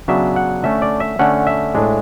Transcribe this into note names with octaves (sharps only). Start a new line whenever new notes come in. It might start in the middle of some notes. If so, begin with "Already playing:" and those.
C#3 F#3 B3 D4 E5
F#5
D3 A3 C#4 E5
D5
E5
D3 A3 C#4 F#5
E5
A2 G#3 D4